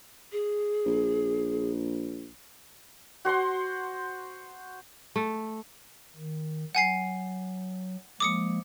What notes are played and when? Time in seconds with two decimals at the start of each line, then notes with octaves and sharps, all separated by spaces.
0.32 G#4
0.86 A#1
3.25 F#4 C5 F#5 C6
5.16 A3
6.16 D#3
6.75 F#3 F#5 G#5 C7
8.20 F3 G#3 A#3 D6 D#6 C#7